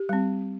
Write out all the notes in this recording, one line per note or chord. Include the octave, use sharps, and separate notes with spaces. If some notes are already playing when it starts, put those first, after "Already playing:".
Already playing: G4
G3 C4